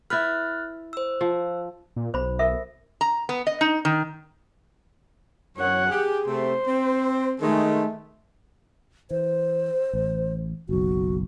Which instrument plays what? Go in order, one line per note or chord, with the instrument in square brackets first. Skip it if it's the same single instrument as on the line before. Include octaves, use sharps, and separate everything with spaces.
[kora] E4 B4 [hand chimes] F6 F#6 A6
[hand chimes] C5 E6
[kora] F3
[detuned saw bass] A#2
[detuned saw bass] B1 [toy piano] C5 B5
[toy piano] A4 A#4 E5
[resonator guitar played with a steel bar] A#5
B3
D#5
D#4
D#3
[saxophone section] F#2 [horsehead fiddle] C#5 F#5
[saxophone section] G4 [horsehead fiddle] G#4
[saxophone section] C3 A3 [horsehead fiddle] C5
[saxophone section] C4
[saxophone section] D#3 G#3 [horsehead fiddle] A3
[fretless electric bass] E3 [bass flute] C5
[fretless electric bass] A1
[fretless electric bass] F#1 B1 [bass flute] F#4